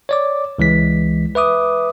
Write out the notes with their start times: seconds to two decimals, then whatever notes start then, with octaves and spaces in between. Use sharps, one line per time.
0.09 C#5 D5 D6
0.58 C#2 E3 G#3 B6
1.35 B4 E5 D6 D#6